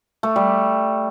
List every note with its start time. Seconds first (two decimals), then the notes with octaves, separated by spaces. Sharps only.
0.23 A3
0.36 G3